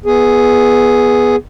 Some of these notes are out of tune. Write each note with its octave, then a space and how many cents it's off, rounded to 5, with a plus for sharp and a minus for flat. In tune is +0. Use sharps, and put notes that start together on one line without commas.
B3 -10 G#4 +0